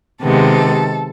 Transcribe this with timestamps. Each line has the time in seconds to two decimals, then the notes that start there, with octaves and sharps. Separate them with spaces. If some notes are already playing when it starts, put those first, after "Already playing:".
0.22 C3 D#3 G#3 B3 A4